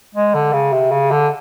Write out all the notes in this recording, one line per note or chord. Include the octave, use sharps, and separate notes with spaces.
G#3
D3
C#3
C3
C#3
D3